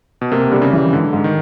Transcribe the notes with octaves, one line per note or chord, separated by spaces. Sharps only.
B2
C3 A#3
D3 G3
C#3
E3
G#2 D3
G#2
D#3